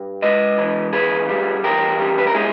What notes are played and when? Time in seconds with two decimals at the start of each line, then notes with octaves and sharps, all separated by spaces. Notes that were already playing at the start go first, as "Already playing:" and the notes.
Already playing: G2
0.22 G#3 B4 D#5
0.58 E3
0.93 C#2 G#4 B4
1.29 G3
1.64 E2 G4 A#4
1.99 G3
2.18 B4
2.27 A#4
2.34 G#3 E4 G#4